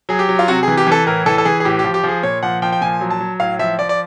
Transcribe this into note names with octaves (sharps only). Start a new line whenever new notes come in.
F#3 G#4
G4
F#3
F4
C3 F#4
E3 G#4
G4
E3 A4
A2 A#4
E3 A4
A4
E3 G#4
G#4
A2 G4
G4
F3
G4
F3 G#4
A#2 C#5
F3 F#5
F3 G5
G5
A#2 G#5
F#3
A5
F#3
A2 F5
F3 E5
F3 D5
D5